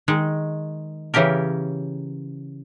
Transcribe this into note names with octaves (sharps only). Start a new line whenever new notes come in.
D#3 G#3
C#3 E3 C#4 G4 A#4